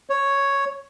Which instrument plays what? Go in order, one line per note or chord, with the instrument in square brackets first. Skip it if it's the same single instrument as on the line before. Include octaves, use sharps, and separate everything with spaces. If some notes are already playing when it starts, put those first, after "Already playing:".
[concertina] C#5